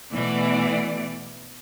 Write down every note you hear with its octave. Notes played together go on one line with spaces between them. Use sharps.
B2 E3 A3 D5